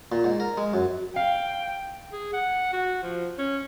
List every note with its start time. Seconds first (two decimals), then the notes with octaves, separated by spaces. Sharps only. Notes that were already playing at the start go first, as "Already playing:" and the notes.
0.12 A#2
0.24 G#2
0.40 A#4
0.57 G#3
0.74 F#2
1.16 F5 G5
2.12 G#4
2.33 F#5
2.73 F#4
3.03 F3
3.38 C#4